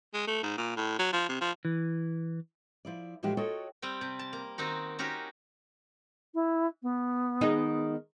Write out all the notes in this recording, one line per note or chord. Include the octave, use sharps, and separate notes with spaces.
G#3
A3
G#2
A#2
A2
F#3
F3
C3
F3
E3
F3 E4 D5
A2 E3 F3 G#3 F#4 G4
F4 F#4 A4 C#5 D#5 G5
G3 C4 G5
C3
A5
A#3
D#3 C4 D#4 F#4
C#4 D#4 F#4 G4 A#4
E4
B3
D#3 G#3 D#4